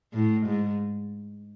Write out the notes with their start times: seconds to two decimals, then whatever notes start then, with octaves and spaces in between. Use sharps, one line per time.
0.14 A2
0.47 G#2